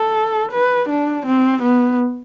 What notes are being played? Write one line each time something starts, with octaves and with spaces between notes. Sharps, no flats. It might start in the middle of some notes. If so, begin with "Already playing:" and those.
Already playing: A4
B4
D4
C4
B3